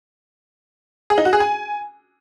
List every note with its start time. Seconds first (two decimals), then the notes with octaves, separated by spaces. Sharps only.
1.10 G#4
1.18 D#4
1.25 F#4
1.33 G#4
1.40 G#5